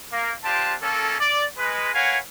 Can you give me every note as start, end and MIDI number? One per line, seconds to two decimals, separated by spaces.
0.12 0.33 58
0.45 0.74 60
0.45 0.74 62
0.45 0.74 65
0.45 0.74 67
0.45 0.74 81
0.82 1.19 58
0.82 1.19 61
0.82 1.19 69
1.20 1.44 74
1.58 1.90 56
1.58 1.90 71
1.94 2.17 70
1.94 2.17 71
1.94 2.17 73
1.94 2.17 77
1.94 2.17 78
1.94 2.17 80